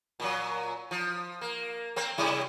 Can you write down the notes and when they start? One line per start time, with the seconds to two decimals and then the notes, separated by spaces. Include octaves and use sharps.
0.20 A#2 F#3
0.91 F3
1.41 A#3
1.96 A#3 C4
2.18 C3 G3 E4